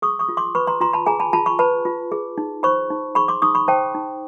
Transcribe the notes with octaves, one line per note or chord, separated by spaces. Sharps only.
G#4 C#6 D#6
C#6 D#6
F4
C6 D6
B4 B5 C#6
A#5 C6
F4 A#5 C6
A5 B5
G#4 G#5 A#5
A5 B5
F4 A5 B5
B5 C#6
B4 A5 B5
F4
G#4
D#4
C5 B5 C#6
D#4
G#4 B5 C#6
C6 D6
D#4 C#6 D#6
B5 C#6
C5 G5 A5
D#4